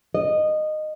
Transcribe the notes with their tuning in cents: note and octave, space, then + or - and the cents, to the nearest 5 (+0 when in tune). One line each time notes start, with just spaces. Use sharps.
D#5 -15